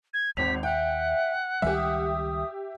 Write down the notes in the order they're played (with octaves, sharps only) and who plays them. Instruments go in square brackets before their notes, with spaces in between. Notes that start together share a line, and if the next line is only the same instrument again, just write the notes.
[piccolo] G#6
[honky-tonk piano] G#1 C4 F7 [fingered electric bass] D#2 [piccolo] B6
[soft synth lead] E5 [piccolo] F#5 [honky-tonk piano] G5
[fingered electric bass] C#2 D#3 G3 [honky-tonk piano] G4 E5 [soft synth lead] G#5
[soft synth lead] D#6